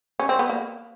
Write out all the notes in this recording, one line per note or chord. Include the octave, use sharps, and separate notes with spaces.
C#4
C4
B3
A#3